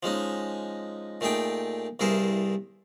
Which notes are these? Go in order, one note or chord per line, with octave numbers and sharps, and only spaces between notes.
F3 G#3 C#4 D#4
A#2 A3 D#4 G#4 G5
C2 G2 E4 G#4 A#4 C5